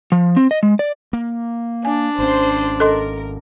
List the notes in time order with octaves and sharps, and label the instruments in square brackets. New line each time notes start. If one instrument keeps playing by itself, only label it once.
[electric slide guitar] F3
C4
D#5
G#3
D5
[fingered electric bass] A#3
[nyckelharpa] D4 [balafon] G#5
[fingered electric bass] G#1 C#4 [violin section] C5
[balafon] A4 D#5 C6 [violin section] A#4